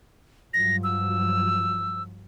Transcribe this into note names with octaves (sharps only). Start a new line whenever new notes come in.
G2 F3 F#3 A#6
E6